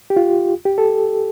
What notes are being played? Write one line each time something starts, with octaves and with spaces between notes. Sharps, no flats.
G4
F4
G4
A4